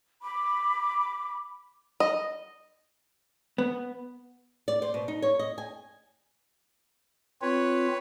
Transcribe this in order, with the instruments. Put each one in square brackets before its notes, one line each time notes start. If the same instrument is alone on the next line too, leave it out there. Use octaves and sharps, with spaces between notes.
[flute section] B5 D6
[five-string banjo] D#5
[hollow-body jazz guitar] B3
[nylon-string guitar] D5
C5
B2
D#4
C#5
D#5
G#5
[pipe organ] C4 F4 [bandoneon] B4 C#5